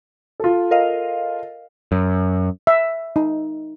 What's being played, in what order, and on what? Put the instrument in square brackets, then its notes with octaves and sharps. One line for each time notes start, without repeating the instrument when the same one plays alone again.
[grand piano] F4 A4
[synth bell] A#4 D#5 F5
[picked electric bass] F#2
[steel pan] E5
D#4